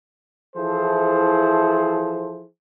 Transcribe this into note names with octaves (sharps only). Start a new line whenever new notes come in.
E3 F3 E4 G#4 A4 C5